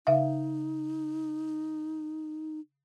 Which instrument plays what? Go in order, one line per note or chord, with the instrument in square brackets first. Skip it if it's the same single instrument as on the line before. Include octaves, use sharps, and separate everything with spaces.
[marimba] C#3 E5 F5 [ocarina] D#4